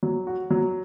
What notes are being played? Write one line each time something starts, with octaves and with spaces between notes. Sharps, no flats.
F#3
F#4
F#3